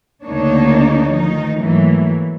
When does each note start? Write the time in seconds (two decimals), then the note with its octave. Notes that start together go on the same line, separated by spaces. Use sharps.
0.25 D2 C#3 A#3 D4 D#4 C#5
1.12 D#3 F3 A3 D#4
1.59 G#2 E3 F#3 A3 A#3